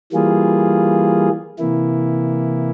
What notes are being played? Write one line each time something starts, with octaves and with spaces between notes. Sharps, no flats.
E3 G3 A#3 F4 G#4
C3 E3 A#3 E4